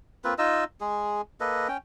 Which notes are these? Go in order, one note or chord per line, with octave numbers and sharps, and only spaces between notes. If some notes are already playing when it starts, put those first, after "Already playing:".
A#3 C4 F4 B4
D#4 F4 D#5 E6
G#3 G#4
A#3 A4 B4 D#5
C#4 G5